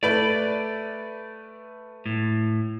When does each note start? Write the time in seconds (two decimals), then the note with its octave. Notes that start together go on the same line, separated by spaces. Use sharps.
0.03 A3 B4 D5 F#7
2.06 A2